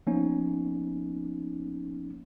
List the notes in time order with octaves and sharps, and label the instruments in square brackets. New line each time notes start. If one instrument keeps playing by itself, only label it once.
[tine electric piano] F3 A#3 B3 C#4 D#4